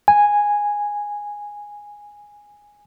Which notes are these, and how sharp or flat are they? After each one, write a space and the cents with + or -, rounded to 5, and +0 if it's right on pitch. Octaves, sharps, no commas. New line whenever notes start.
G#5 -10